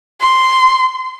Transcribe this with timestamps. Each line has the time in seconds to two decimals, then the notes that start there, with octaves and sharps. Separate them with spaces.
0.21 C6